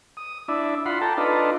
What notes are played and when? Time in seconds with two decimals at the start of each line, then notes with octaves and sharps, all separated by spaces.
0.17 D#6
0.48 D4 E4
0.86 F4 F#5 B5 C6
1.01 A4 G5 A5 A#5
1.18 D4 D#4 F4 A4 B4